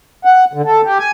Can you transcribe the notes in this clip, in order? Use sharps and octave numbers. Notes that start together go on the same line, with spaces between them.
F#5
D3
A4
G4
G#5